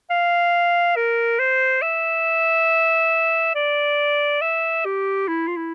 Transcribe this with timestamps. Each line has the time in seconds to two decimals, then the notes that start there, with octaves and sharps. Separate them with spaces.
0.10 F5
0.96 A#4
1.39 C5
1.82 E5
3.55 D5
4.41 E5
4.85 G4
5.28 E4
5.48 F4
5.57 E4